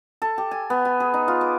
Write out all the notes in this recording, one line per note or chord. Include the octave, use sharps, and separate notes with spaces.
A4
G4
G#5
B3
G#5
G#4
D#4
F4
D6